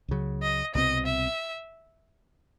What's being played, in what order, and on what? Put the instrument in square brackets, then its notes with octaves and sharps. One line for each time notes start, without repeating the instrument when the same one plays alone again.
[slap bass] C#2 C#3 F#3
[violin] D#5
[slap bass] C2 B2 G3 C4 [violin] D#5
[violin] E5